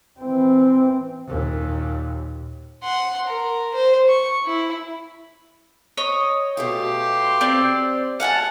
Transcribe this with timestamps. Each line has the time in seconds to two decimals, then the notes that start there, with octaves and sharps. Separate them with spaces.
0.20 E3 C4
1.27 D#2 A#2
2.83 F#5 C6
3.27 A#4
3.74 C5
4.09 C#6
4.46 E4
5.97 C#5 D#5 D#6
6.57 B2 A3 F4 G4 C6
7.41 C4 D5
8.20 A3 G#4 F5 F#5 G#5 A5